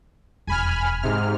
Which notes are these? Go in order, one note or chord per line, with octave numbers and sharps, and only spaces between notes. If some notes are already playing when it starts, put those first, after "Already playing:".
E1 F2 G#5 B5 F6
G#2 C3 F6